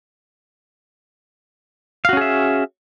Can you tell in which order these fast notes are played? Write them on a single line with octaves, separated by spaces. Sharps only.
F5 F#4 C#4 G#4 E5